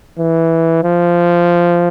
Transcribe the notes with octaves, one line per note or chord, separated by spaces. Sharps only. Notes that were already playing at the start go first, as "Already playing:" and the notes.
E3
F3